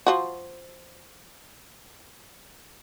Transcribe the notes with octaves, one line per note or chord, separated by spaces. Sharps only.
F3 F#4